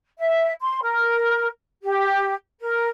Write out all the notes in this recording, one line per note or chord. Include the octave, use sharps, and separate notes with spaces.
E5
C6
A#4
G4
A#4